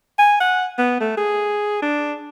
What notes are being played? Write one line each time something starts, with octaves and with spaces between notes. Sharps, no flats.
G#5
F#5
B3
A3
G#4
D4